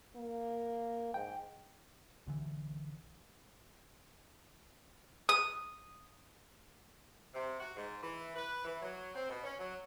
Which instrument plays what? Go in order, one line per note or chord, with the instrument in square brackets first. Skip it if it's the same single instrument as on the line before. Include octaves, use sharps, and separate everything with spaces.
[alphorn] A#3
[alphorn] G#2 [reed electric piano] G5
[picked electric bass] B1 D3 E3
[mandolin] D#6
[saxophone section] C3
F#4
G#2
E3
B4
E3
F#3
C4
B2
C#4
F#3